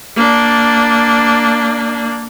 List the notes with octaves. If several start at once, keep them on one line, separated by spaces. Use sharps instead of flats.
A#3 D4